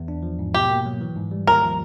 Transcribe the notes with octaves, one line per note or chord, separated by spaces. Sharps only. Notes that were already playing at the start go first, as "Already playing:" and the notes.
Already playing: E2
D4
F3
G#2
B2 G4
A#3
F#3
E3
G#2
G3
D#2 A#4
F3